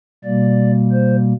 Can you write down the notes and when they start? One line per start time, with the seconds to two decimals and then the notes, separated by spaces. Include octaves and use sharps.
0.24 B2 G3 A#3 D5
0.92 C5